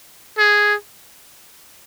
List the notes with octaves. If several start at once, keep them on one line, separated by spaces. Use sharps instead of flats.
G#4